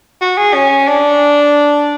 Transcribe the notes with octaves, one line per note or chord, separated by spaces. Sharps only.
F#4
G#4
C#4
D4